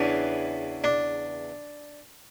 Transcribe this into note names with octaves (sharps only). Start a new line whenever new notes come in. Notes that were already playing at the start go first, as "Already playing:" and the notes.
Already playing: E2 C#3 E3 D4
D4